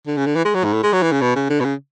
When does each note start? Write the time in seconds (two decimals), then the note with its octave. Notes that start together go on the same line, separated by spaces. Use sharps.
0.07 D3
0.16 C#3
0.26 D3
0.35 E3
0.45 G#3
0.54 F#3
0.64 G#2
0.73 A2
0.83 G#3
0.93 F#3
1.02 E3
1.12 C#3
1.21 B2
1.35 C#3
1.50 D3
1.60 B2
1.64 C#3